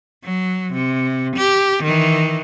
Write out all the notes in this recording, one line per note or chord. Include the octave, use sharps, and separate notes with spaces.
F#3
C3
G4
D#3 E3